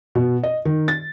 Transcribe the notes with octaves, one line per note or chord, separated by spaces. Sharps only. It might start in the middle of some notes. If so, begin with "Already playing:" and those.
B2
D#5
D#3
A6